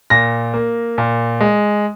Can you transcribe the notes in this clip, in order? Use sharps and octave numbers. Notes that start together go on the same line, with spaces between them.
A#2 A#6
A#3
A#2
G#3